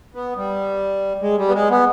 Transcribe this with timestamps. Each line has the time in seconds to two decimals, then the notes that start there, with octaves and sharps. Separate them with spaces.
0.14 B3
0.36 G3
1.22 G#3
1.38 G3
1.48 B3
1.54 G#3
1.70 B3